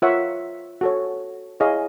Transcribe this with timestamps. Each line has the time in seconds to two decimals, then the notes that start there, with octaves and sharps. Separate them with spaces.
0.02 F4 A#4 C#5 E5 F#5
0.81 F#4 A4 C#5
1.60 E4 G#4 C#5 D#5 F5